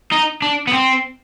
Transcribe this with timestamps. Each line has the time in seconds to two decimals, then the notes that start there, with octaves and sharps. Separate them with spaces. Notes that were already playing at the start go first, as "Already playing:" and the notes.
0.12 D#4
0.42 D4
0.67 B3
0.73 C4